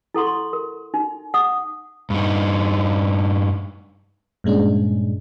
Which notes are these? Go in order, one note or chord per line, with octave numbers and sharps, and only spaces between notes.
E4 A4 F#5 C6 C#6
C6
A#4
D#4
F#5 D#6
G2 D#4
G2 A#2 G#3 C#4 D4